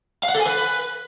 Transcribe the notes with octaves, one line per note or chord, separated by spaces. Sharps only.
F5
F#5
A4
G#5
B4